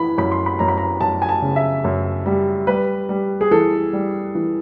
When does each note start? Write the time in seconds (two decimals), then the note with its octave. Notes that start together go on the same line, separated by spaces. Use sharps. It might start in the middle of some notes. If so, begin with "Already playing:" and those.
Already playing: E3 B5
0.18 F#2 B5
0.32 C6
0.46 B5
0.59 F#2 A#5
0.68 B5
0.78 A#5
1.01 F#2 A5
1.22 G#5
1.29 A5
1.42 C#3
1.56 E5
1.84 F#2
2.26 G3
2.67 G3 B4
3.09 G3
3.41 G#4
3.51 E3 A4
3.93 G3
4.35 E3